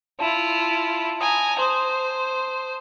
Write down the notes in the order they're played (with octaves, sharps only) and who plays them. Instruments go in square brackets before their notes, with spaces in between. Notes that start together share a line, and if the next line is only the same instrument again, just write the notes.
[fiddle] E4 F4 [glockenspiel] A5 E7
[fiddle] G#5 A#5 [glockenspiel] D#6
[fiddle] C5 [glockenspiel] C6 D#6